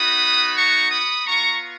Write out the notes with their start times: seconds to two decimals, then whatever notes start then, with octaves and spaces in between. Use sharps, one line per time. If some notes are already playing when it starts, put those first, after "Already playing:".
Already playing: B3 D#4 F#4 B5 D#6
0.57 A#5 C#6
0.91 B5 D#6
1.27 B3 F4 A#5 C#6